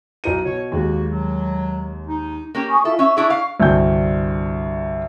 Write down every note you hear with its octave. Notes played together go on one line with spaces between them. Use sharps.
B1 D#4 D#7
B2 C#5
D#2 G#3 A#3 F#4
F#3
D#4
A#3 C#4 G4
G#5 C#6 D#6
E4 F4 A4 E5
C#4 E5 C#6
D4 E4 G#4
F5
C2 G2 D3 F#4 G#5 G6